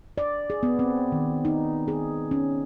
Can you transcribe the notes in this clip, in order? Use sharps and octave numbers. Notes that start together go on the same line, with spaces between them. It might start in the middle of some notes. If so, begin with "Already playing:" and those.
D5
G#4
B3
C4
D#3
D#4
G#4
C#4